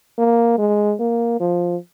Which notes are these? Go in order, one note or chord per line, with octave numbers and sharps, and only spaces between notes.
A#3
G#3
A#3
F3